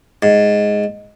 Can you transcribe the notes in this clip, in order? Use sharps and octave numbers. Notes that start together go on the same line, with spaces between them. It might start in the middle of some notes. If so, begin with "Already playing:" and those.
G#2